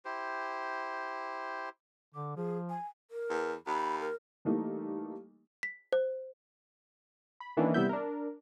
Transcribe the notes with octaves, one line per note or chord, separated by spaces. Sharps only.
E4 G4 C5
D3 D6
F3 G#4
G#5
A#4
E2
D#2 B5
A#4
E3 G3 A3 A#3 D#4
B6
C5
B5
D#3 E3 A#3 C#4 D4
C3 G3 B3 E4 E5 G6
D4 A#4